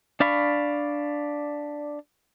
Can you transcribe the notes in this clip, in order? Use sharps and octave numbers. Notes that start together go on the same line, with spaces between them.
D4 D5 F5 B5 C#6